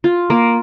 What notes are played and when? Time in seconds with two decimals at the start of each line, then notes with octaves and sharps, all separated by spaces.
0.04 F4
0.30 A#3